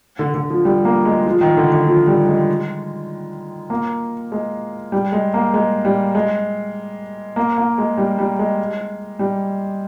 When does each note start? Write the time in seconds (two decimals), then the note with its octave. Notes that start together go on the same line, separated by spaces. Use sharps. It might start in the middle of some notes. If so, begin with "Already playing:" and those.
0.19 D3
0.34 D3
0.50 F3
0.65 G3
0.85 A#3
1.05 G#3
1.26 F3
1.41 D#3
1.57 D3
1.72 D3
1.87 F3
2.07 G3
2.28 G#3
3.70 A#3
4.32 G#3
4.92 G3
5.12 G#3
5.34 A#3
5.54 G#3
5.85 G3
6.15 G#3
7.36 A#3
7.58 A#3
7.78 G#3
7.98 G3
8.19 G3
8.39 G#3
9.19 G3